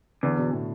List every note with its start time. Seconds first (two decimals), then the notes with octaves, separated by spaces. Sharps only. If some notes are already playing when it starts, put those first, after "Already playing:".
0.23 E2 D3
0.38 B2
0.53 A2